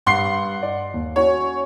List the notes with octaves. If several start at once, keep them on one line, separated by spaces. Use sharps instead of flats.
G2 F#5 C6 C7
D5
D#2
C#4 F#4 C#5